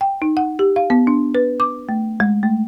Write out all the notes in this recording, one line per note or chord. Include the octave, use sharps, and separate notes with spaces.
G5
D#4
F#5
G4
F5
B3
D4
B4
D6
A3
G#3
A3